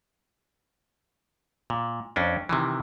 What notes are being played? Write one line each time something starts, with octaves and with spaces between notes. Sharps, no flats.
A#2
F2 C#4 D4
C3 D#3 E3